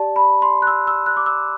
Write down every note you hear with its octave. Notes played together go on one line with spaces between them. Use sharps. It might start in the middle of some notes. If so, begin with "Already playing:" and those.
Already playing: G4 D5 A5
B5
C6
F#6
E6
E6
F#6
D6
E6